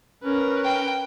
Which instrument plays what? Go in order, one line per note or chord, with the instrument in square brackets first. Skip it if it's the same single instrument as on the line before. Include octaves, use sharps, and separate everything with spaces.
[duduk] C#4 [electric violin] A#4 B4
[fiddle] G5